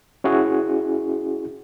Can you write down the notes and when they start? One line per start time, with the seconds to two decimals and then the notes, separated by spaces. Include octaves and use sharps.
0.24 C#4 E4 F#4 G#4